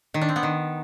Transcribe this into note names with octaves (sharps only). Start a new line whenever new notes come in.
D#3
D4
C4
B3
D#3